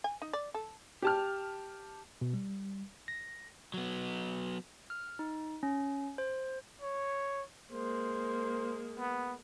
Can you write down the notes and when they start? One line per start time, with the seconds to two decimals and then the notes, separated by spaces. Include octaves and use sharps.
0.04 G#5
0.22 D#4
0.33 D5
0.54 A4
1.02 G4 A5 F6
2.21 B2
2.34 G3
3.08 A#6
3.74 F#3 B3
4.90 F6
5.19 D#4
5.63 C#4
6.18 C5
6.82 C#5
7.72 G#3 A#3 C5
8.99 B3